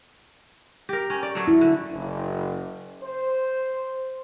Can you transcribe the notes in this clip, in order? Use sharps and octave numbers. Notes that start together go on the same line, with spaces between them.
G4 A#4
C#4
D5
F#3 A3
E4
D3
F#1
C5